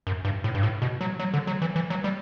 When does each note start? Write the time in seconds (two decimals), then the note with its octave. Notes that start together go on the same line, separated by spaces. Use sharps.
0.07 F#2
0.25 G2
0.44 A2
0.55 G2
0.63 A2
0.82 B2
1.01 F#3
1.19 F#3
1.34 D3
1.47 F#3
1.62 E3
1.76 E3
1.90 F#3
2.04 G3